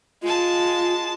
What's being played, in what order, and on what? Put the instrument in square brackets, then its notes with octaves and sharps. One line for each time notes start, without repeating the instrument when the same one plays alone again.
[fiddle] G#3 A5 [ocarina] F4